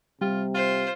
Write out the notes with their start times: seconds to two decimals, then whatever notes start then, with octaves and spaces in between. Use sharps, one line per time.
0.21 C3 G3 F4
0.54 F4 C5